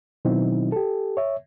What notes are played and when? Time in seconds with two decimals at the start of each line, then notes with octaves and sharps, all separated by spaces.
0.25 B2 D#3 F#3 C4 D#4 E4
0.72 G4 A4
1.17 C#5 E5